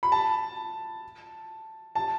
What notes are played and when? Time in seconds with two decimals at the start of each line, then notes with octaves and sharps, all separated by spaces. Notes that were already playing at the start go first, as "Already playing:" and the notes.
0.03 B5
0.12 A5
1.95 A5